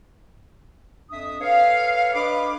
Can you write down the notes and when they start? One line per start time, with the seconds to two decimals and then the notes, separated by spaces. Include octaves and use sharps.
1.11 F2 D4 E5 D#6
1.40 A4 B4 C#5 F5
2.15 D4 B4 D#5 B5 D6